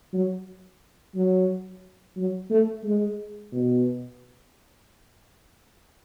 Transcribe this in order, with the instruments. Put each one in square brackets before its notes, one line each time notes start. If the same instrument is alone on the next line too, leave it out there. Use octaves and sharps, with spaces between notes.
[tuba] F#3
F#3
F#3
A3
G#3
B2